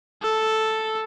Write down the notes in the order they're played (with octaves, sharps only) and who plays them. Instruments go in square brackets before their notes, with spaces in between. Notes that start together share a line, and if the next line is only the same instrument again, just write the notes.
[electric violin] A4